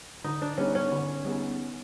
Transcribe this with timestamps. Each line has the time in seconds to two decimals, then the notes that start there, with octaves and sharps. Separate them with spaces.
0.24 D3 D#4
0.42 D4
0.58 G3 B3 C#4 D#4 G#4
0.75 C#4
0.92 D3
1.25 G3 B3 D#4 G#4